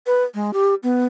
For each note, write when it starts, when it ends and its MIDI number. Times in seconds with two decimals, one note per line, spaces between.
0.07 0.24 71
0.34 0.51 56
0.53 0.74 67
0.83 1.06 59